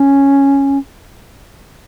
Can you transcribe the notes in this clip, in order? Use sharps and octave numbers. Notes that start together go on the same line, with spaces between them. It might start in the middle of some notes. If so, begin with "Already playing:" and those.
Already playing: C#4